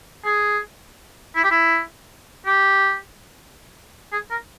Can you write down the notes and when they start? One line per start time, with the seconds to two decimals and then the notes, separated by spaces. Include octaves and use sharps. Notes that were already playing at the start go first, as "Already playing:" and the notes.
0.25 G#4
1.36 E4
1.44 G4
1.51 E4
2.46 G4
4.12 G#4
4.31 A#4